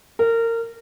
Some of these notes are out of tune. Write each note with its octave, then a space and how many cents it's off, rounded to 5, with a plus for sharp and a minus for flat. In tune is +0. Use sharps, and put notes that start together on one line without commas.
A#4 -25